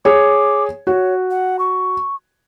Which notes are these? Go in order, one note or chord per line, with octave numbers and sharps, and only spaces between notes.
G#4 C#5 D6
F#4 C#5
F#5
C#6